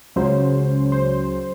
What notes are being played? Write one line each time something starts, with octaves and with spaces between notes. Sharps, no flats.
C#2 C#3 F#3 C#4 C5
C5